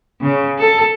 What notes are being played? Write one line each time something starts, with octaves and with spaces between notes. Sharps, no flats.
C#3
A4